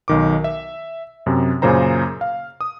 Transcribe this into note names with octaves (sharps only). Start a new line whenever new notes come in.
B1 D#3 D6
E5
F#2 C3
F#2 A#2 C#3 C5 A#5
F5
D#6